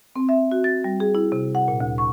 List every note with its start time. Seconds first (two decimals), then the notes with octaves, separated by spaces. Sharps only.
0.16 C4
0.29 E5
0.52 F#4
0.64 A6
0.84 G3
1.00 G#4
1.15 E4
1.32 C3
1.55 F#5
1.68 A#2
1.81 D2
1.98 C#6